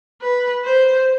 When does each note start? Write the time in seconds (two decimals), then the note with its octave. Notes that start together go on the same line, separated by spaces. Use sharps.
0.21 B4
0.65 C5